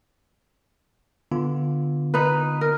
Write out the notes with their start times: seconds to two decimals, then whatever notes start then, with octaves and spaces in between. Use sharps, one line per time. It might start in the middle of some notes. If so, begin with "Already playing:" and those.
1.31 D3 B3 F4
2.14 D#4 B4
2.61 A#4